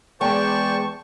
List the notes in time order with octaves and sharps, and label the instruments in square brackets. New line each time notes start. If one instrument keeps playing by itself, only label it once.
[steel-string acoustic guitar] E2 G#3 G5 [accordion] C5 D5 A5 [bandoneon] C#6